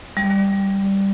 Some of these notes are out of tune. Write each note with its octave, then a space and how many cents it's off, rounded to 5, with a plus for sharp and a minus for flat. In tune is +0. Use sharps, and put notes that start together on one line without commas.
G3 +0